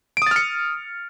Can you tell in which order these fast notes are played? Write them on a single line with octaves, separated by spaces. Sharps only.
D7 D#6 A6 F6 C#7